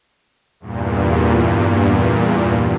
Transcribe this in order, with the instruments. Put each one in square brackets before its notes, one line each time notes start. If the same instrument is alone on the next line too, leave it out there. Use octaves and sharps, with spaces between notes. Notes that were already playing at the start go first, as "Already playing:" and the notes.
[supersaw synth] E2 G2 A#2